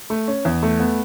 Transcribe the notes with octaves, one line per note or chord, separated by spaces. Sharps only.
A3
C#4
E2
A3
B3